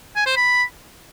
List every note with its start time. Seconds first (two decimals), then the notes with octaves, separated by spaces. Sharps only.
0.16 G#5
0.26 C5
0.36 B5